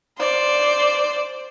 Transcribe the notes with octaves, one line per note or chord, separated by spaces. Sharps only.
C5 D5